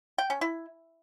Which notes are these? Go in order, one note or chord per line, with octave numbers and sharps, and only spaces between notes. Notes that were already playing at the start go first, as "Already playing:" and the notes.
G5
C#4
E4